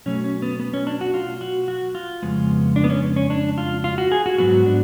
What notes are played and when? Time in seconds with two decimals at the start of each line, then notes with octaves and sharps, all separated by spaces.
0.06 B2 F#3 A3 C#4
0.24 C#4
0.42 B3
0.59 B3
0.74 C#4
0.87 D4
1.01 F#4
1.14 F4
1.41 F#4
1.68 F#4
1.95 F4
2.23 F2 C#3 G#3 B3
2.76 D4
2.84 B3
2.90 C#4
3.16 C#4
3.30 D4
3.58 F4
3.84 F4
3.98 F#4
4.12 G#4
4.26 F#4
4.38 G#2 F#3 B3 F#4
4.66 D4